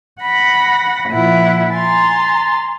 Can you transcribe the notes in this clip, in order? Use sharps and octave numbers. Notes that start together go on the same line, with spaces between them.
F#5 B5 A#6
A#2 F3 E4 F#5
G#5 A#5 C6 A6